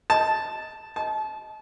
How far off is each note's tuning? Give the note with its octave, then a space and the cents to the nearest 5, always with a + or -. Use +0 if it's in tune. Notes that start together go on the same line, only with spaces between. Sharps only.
A5 -5
A5 -30